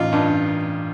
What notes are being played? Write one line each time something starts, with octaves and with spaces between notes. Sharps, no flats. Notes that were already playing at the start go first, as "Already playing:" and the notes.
Already playing: A1 D#4 F4
G2 D4